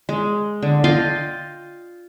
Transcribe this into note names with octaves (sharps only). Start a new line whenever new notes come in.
G#3
D3
F4 D#5 F5 G5